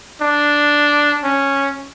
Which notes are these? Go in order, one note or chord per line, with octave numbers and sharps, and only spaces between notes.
D4
C#4